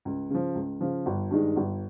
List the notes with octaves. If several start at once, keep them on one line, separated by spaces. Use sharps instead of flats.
C#2
C#3 F3
C#2
C#3 F3
G1
G2 D#3 G#3 D#4
G1